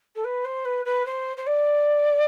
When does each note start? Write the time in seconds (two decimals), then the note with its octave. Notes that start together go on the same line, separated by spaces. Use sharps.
0.16 A4
0.24 B4
0.45 C5
0.65 B4
0.85 B4
1.06 C5
1.37 C5
1.47 D5